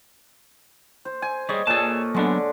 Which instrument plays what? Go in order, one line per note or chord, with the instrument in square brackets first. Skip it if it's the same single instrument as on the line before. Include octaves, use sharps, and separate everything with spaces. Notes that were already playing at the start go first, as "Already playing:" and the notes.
[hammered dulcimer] C5
G#5
[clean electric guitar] G3 G#4 [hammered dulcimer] C#5 D#5
[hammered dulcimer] A#2 A4 [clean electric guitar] G#4 A5
[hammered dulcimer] D3 G#3 [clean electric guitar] F#3 B3 D4